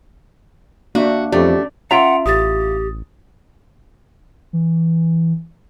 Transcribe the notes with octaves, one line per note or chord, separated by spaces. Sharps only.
A#3 D4 F#4 E5
F2 A3 C#4 G4 D5
C#4 F4 E5 F#5 A#5 C6 D7 F7
A1 G4 D#6 A6
E3